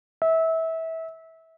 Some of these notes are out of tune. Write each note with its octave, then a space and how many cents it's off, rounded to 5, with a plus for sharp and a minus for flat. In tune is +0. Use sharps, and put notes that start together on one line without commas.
E5 -25